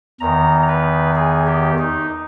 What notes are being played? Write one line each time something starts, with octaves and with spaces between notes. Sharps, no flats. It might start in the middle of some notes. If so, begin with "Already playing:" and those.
E2 D#3 A#5
B4
G#4
G4
D#4